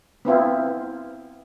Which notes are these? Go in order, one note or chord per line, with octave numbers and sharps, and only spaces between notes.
B3 C4 E4 F4